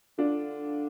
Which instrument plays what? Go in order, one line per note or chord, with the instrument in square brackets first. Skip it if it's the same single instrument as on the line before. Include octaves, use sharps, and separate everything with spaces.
[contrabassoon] D3 [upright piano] D4 F4